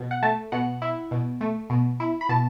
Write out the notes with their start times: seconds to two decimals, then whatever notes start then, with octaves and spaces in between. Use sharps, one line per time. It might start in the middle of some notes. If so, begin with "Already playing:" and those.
Already playing: B2
0.11 F#5
0.23 A3 A5
0.52 B2 F#5
0.82 E4
1.11 B2
1.41 A3
1.70 B2
2.00 E4
2.21 B5
2.29 B2 A5